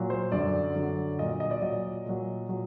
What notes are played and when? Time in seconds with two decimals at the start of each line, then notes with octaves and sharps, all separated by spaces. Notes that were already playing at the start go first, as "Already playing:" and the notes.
Already playing: A#2 F#3
0.10 C5
0.32 F#2 D3 F#3 D5
0.75 F#2 D3 F#3
1.19 A#2 F#3 D#5
1.40 D#5
1.51 D5
1.62 A#2 F#3 D#5
2.06 A#2 F#3
2.49 A#2 F#3